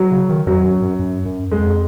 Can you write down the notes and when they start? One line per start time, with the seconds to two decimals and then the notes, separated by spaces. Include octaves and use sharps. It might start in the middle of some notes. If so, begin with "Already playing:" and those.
Already playing: F#3
0.11 C#3
0.29 D#3
0.46 F2 F#3
0.64 F#2
0.81 F#2
0.99 F#2
1.25 F#2
1.51 F2 G#3